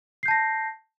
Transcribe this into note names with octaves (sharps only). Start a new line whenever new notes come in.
A5 G6 A#6 C7